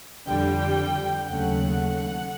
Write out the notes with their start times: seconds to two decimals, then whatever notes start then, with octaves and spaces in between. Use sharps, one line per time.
0.27 F2 D3 G3 G5
1.27 D#2 C#3 F#3 A3 F#5